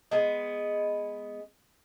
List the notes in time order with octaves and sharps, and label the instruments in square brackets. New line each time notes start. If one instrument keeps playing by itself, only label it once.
[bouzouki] G#3 B3